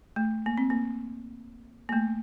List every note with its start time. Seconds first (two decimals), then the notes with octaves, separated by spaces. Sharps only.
0.16 A3
0.46 A#3
0.58 C4
0.70 A#3
1.89 A#3
1.93 A3